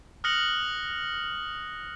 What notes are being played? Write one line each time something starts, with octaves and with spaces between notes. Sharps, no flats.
D#6 F6 F#6 A#6 C#7 F#7